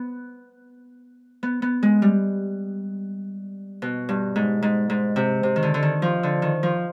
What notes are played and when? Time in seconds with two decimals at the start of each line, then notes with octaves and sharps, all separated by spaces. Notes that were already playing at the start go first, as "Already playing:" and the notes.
Already playing: B3
1.43 B3
1.62 B3
1.83 G#3
2.02 G3
3.82 B2
4.09 G2
4.36 G#2
4.62 G#2
4.90 G#2
5.16 C3
5.43 C3
5.56 D#3
5.63 D3
5.74 D3
5.83 D#3
6.02 F3
6.23 D3
6.42 D#3
6.63 F3